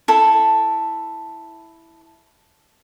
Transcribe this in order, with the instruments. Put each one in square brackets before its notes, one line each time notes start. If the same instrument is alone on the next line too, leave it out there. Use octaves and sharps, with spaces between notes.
[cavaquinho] E4 A4